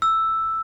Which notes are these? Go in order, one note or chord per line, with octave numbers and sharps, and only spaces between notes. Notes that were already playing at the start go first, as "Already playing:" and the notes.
E6